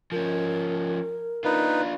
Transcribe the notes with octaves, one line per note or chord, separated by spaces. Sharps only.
F3 C#4 A#4
D4 D#4 F4 B4